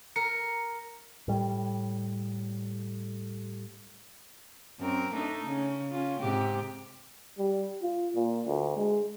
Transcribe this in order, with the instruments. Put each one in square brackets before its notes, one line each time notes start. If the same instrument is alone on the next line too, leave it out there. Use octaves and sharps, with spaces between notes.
[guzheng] A#4 [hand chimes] C#7
[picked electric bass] A2 G3
[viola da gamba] F#2 C4 A#4
A3 D4 D#4
C#3 C#4
C#4 F4
G#2 C3 G4
[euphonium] G3
F4
A#2
D2
G#3